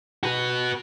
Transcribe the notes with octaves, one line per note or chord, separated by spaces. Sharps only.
F#4 B4